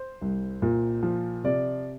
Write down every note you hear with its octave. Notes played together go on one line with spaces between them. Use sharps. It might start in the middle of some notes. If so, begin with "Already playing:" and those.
Already playing: C5
C2
A#2
F3
C3 D5